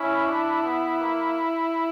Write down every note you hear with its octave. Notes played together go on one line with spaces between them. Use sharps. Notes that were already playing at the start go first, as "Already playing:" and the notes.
Already playing: C#4 E4
D4
B3
A#3